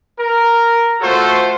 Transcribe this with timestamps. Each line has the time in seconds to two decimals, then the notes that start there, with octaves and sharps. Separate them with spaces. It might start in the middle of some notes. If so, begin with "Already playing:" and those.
0.19 A#4
1.01 A3 F4 F#4 A4 C5